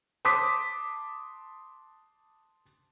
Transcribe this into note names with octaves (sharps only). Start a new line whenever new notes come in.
A5 C6 D6 D#6 B6